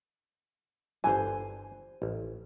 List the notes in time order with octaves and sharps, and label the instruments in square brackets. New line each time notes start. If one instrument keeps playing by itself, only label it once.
[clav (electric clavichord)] G1 D3 E3 [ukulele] C5 G#5
[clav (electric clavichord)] A1